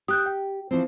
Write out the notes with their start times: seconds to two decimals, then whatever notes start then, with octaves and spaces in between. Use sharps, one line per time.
0.08 G4 D#6 F#6 G6
0.26 G5
0.71 E3 F3 C4